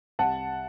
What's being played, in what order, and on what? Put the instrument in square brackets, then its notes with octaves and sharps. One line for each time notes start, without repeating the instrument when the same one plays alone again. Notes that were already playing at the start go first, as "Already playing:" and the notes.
[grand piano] C2 F#5 A5